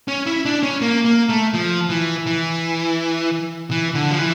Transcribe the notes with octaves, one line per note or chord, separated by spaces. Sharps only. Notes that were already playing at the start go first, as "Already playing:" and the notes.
C#4
E4
D4
C#4
A#3
A#3
A3
F3
E3
E3
E3
D3
F3
E3